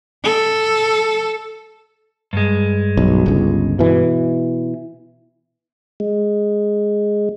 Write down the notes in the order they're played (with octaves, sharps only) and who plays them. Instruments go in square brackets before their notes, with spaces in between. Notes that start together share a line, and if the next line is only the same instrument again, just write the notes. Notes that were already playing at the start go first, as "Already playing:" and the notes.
[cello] A4
[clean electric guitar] G2 G#3
[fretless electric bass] B1
G1 C#2
B2 E3
[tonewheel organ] G#3